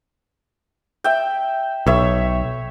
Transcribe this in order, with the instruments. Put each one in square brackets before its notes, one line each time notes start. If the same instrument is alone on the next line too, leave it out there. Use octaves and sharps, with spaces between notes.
[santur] E5 G5
[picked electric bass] B1 [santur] C#5 E5